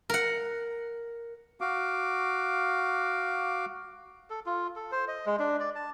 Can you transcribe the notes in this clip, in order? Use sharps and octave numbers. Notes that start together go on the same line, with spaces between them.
A#4 F#5
F#4 F5 D6
A4
F4
A4
C5
D#5
G#3
D4
D5
A5